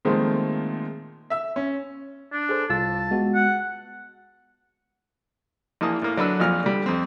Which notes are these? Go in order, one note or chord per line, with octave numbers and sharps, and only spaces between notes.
A#2 D#3 F3 G#3 A3 C4
E5 E6
C#4
D4
G#4 A4 C5
C2 F4 A5 E6
G#3 B3 F#4
F#5
A#1 E3 A#3 A5 D#6
A2 A#3
D3 F#3 D4 B4 E6
A#1 F2 A#2 F3 F6
D3 G3
F2 C4